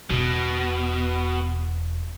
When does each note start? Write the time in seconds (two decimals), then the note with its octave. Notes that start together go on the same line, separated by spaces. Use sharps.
0.10 E1 B2